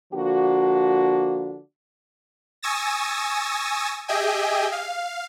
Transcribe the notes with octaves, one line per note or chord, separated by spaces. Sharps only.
D3 F3 A#3 D4 F#4
G#5 C#6 D#6 E6 A6 A#6
G4 G#4 D#5 E5 G5 G#5
F5